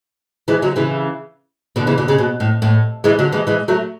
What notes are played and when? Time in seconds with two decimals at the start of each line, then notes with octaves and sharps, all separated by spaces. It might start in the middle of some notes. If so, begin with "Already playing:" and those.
0.48 E3 G#3
0.62 D3 F#3
0.76 C#3 E3
1.76 B2 D3
1.87 C#3 E3
1.98 B2 D3
2.08 C#3
2.18 B2
2.40 A2
2.62 A2
3.04 E3 G#3
3.19 D3 F#3
3.32 E3 G#3
3.47 E3 G#3
3.68 F#3 A3